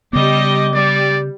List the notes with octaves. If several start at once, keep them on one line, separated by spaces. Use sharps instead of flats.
C#3 G3 B3 D#5 D6
G3 D5